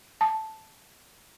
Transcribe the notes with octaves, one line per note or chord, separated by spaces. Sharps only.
A5